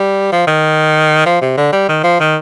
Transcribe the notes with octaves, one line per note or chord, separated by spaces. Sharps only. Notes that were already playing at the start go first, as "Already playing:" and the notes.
Already playing: G3
F3
D#3
F3
C3
D3
G3
D#3
F3
D#3